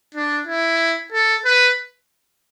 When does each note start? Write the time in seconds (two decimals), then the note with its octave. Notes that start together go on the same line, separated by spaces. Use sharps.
0.14 D4
0.47 E4
1.13 A4
1.45 B4